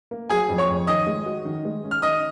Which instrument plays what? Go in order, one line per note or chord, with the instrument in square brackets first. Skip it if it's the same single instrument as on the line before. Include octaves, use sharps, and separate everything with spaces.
[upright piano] A#3
[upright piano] F#3 [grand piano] G#4 G#5
[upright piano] F2
[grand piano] C#5 C#6
[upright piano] F2
[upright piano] D#3 [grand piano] D#5 D#6
[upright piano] G#3
F#4
D#3
G#3
C#4
[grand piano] F6
[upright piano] D#3 [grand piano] D#5 D#6